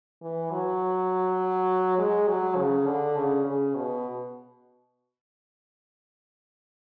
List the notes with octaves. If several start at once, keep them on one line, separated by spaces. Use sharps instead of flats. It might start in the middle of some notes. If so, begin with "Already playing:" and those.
E3
F#3
G#3
F#3
C#3
D3
C#3
C#3
B2